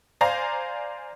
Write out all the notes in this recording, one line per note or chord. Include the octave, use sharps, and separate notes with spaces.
C5 D5 F5 G#5 A#5